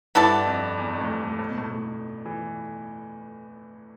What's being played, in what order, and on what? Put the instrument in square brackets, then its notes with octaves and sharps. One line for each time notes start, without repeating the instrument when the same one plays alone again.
[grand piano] G2 [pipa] B3 E4 A4 D5
[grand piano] F2
E2
F2
A2
G2
A2
A2
B2
A2
A2
E3